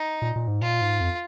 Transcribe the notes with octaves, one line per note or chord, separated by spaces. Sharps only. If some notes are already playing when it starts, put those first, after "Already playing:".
Already playing: D#4
A#2
A#2
G#2
A#2 F4
G#2
F2